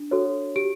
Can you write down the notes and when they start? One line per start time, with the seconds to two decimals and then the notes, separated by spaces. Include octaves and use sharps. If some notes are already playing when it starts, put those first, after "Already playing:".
Already playing: D4
0.11 F#4 A4 C#5
0.56 G4 D7